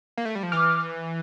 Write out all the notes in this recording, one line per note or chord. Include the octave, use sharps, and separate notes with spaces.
A#3
A3
G3
F3
E3 D6 F6